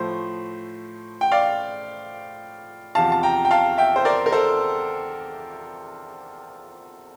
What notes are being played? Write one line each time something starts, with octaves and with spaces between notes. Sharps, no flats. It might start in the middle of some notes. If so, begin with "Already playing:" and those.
Already playing: A2 F3 A3 C5
G5
D5 F5
E2 C3 F3 F5 A5
A5
G5 A#5
G5
F5 A5
E5 G5
C5
A#4 D5
A#4
A4 C5